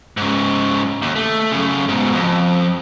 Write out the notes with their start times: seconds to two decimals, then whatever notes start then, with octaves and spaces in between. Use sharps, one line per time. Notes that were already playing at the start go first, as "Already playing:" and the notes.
0.17 G#2 C#3
1.02 D#2
1.16 A3
1.52 F#2 C#3
1.89 G#2 B2
2.15 F2